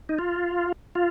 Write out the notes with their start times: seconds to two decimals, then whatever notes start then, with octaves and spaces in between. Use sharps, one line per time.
0.09 D#4
0.19 F4
0.95 F4